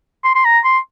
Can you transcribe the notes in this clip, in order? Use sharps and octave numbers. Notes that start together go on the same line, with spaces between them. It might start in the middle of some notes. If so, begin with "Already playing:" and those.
C6
C6
A#5
C6